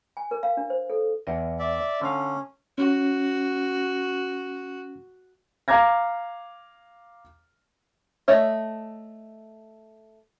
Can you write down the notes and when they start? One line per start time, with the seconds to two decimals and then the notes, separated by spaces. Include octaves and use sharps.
0.17 G#5
0.31 A#4
0.43 F5
0.57 D4
0.70 C5
0.90 A4
1.27 E2 D#5
1.59 D5 E5
2.01 D3 C#4 F5
2.78 C#4 F#4
5.68 F5 A#5 D6 G#6 A#6
8.28 A3 C#5 D#5 E5